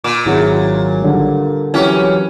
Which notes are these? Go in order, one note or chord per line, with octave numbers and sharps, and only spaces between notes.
A#2 D6
G#1 F#3 E4 G#4 F#5
D3 G3
E3 F#3 C#4 G4